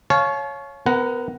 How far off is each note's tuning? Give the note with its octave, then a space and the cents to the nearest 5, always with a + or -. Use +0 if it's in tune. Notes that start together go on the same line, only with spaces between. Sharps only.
C#5 +0 F5 +0 A5 -45
B3 +30 A#4 +10 F#5 +0